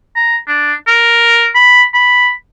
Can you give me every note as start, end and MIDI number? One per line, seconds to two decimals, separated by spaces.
0.16 0.37 82
0.48 0.73 62
0.87 1.49 70
1.55 1.85 83
1.94 2.31 83